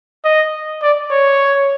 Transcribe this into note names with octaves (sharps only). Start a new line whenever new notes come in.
D#5
D5
C#5